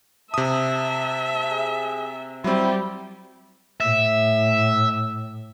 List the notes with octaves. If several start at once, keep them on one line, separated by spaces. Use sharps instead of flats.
C3 E5 A5 D#6
G#4
F#3 G3 C4 E4 G4
A2 E5